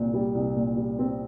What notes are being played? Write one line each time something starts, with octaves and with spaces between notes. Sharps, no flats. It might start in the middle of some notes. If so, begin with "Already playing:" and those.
Already playing: C2 A#2
G3
C2
A#2
G3
C4